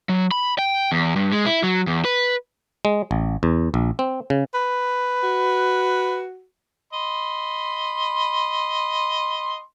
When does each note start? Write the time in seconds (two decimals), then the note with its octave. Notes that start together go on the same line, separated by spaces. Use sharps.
0.09 F#3
0.31 B5
0.59 G5
0.92 E2
1.16 G2
1.33 G#3
1.46 E4
1.63 F#3
1.87 E2
2.05 B4
2.85 G#3
3.11 A1
3.43 E2
3.74 A#1
3.99 C4
4.30 C#3
4.54 B4
5.23 F#4
6.93 D#5 B5 C6